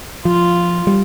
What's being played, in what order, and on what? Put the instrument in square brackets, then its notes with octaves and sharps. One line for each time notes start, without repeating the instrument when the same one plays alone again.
[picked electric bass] F3 [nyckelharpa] F4
[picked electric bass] G3